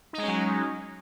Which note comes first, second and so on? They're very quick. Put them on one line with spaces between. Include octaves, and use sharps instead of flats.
D#4 G#3 C#4 F#3